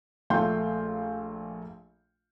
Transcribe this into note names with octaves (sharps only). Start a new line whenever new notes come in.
A#1 A3 F5 G5 C6 G6